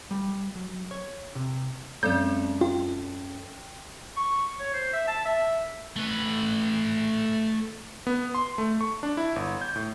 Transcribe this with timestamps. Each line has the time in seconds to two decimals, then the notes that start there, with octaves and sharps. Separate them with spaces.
0.11 G3
0.55 F#3
0.91 C#5
1.35 C3
2.03 F#2 G#3 C4 A4 D5 G6
2.61 F4 G5
4.17 C#6
4.60 C#5
4.73 C5
4.93 E5
5.08 A5
5.25 E5
5.96 A3 B4
8.07 B3
8.35 C6
8.58 A3
8.81 C#6
9.03 D4
9.17 E4
9.36 G1
9.61 G6
9.76 A2